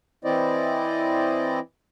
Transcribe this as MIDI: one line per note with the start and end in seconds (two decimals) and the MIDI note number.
0.25 1.59 52
0.25 1.59 60
0.25 1.59 64
0.25 1.59 72
0.25 1.59 74
0.25 1.59 75